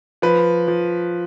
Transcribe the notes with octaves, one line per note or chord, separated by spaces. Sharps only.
F3 B4
F3